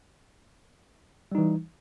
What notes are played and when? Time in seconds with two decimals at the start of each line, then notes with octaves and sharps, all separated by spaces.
1.32 G3
1.35 D#4
1.38 E3